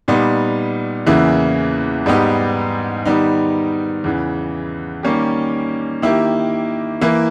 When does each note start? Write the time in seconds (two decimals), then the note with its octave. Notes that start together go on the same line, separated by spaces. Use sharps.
0.08 A#2 G3 B3 D#4
1.06 E2 C#3 E3 A#3 E4
2.06 G#2 G3 B3 D#4 G4
3.05 D#3 G3 B3 D#4
4.04 E2 C#3 E3
5.03 D#3 G3 A#3 C#4 G4
6.02 D#3 A#3 E4 G4
7.01 E3 A#3 E4